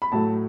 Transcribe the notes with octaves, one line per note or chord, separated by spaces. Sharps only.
B5
A2 F#3 A3 A5